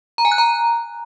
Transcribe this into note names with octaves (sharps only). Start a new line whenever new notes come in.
A#5
G#5
F#6
A#5